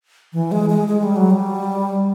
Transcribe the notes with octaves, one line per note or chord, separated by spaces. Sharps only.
E3
G#3
G#3
G#3
G3
F#3
G3